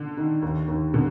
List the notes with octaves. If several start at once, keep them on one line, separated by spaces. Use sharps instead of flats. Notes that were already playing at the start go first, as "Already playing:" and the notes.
Already playing: D3
D#3
D#2
D#2
D3 G3